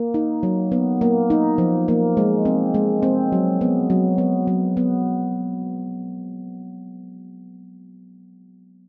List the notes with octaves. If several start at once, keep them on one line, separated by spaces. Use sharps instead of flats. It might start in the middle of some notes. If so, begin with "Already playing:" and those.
Already playing: A#3
D#4
F#3
B3
A#3
D#4
F3
A#3
G#3
C4
G#3
C4
F#3
B3
F#3
B3
F#3
B3